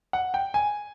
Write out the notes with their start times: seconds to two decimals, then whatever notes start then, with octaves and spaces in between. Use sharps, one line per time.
0.13 F#5
0.34 G5
0.54 G#5